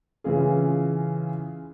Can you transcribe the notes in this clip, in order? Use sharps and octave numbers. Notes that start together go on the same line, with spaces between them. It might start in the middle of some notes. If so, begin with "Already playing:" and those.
C#3 E3 C#4 F4 G#4